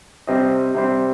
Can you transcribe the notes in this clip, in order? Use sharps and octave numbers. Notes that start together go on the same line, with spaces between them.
C3 G3 C4 D#5
C3 G3 C4